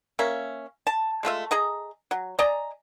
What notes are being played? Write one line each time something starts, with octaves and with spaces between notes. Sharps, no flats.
A#3 C#4 E5
A5
G#3 A3 F4 E5
G#4 D#5 A#5
F#3
D5 D#5 G#5 A#5